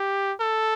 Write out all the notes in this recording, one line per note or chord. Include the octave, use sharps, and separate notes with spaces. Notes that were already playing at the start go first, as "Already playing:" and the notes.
Already playing: G4
A4